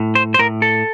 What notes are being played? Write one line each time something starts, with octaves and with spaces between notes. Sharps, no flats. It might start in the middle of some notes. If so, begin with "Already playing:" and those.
Already playing: A2
C5
C5
A2 A#4
A4